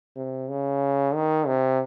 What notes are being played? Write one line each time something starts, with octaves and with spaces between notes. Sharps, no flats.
C3
C#3
D#3
C3